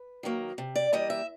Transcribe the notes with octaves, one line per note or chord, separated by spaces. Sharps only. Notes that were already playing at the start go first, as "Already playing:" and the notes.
Already playing: B4
D#3 F#3 A#3
C3
D5
E3 G3 A#3 D#5
E5